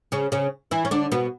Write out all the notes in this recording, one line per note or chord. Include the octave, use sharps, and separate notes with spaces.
C#3 C#4
C#3 C#4
E3 E4
C#4
D3 D4
B2 B3